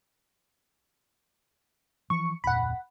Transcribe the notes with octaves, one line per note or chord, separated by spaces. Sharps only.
E3 F3 C#6
D1 F2 A#2 F#5 B5